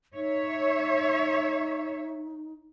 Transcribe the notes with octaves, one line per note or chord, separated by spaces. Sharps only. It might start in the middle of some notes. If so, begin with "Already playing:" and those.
D#4 C#5 E5